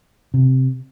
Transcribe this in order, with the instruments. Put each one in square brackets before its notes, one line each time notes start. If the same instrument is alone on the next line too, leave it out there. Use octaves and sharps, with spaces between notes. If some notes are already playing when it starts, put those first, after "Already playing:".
[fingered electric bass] C3